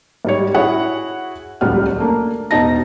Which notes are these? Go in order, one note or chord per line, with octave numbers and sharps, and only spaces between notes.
G#2 G3 C#5
E4 F#4 G#4 C#5 F#5
D#1 C#2 F#3 G3 F#5 F6
A3 A#3 D4
E1 B2 D#4 A5 A#6